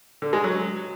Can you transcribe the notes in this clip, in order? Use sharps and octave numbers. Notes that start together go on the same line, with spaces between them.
D3
G#3
F#3